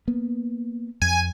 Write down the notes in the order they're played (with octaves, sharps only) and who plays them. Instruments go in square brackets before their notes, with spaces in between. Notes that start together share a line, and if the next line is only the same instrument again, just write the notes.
[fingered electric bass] A#3 B3
[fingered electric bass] F2 [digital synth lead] G#5